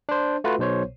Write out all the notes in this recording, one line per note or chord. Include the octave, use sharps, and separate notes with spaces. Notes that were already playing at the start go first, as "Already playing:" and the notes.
D4 C5
A3 F4 F#4 B4
B1 B2 C5 C#5